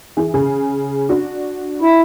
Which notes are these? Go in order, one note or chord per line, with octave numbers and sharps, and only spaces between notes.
E3 G#4
C#3 G#4
D4 F#4
E4